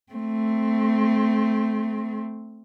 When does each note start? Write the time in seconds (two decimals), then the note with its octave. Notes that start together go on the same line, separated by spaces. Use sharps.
0.13 A3 C4